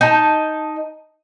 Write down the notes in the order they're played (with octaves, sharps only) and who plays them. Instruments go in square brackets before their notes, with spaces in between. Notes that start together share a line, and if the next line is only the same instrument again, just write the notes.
[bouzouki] D#4 A5